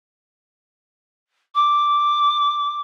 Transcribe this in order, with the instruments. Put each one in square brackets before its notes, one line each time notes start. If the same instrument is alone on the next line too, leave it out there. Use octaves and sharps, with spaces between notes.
[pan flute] D6